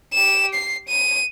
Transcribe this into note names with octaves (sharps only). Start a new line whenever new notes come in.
G4 E7
C7
D#7